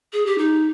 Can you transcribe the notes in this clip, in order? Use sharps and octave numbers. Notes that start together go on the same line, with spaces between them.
G#4
G4
D#4